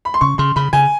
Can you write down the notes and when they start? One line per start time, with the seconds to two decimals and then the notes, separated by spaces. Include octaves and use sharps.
0.05 B5
0.14 C6
0.21 C#3 C#6
0.38 C#3 C6
0.56 C#3 B5
0.73 C#3 G#5